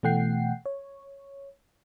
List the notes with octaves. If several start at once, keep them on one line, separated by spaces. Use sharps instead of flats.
B2 E3 A3 F#5 G5 C7
C#5